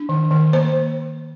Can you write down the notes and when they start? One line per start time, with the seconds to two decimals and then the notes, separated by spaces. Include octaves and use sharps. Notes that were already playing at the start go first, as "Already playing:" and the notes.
Already playing: D4
0.09 D#3
0.31 D#3
0.53 A#3 C5